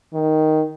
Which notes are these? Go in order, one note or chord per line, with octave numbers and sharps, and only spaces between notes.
D#3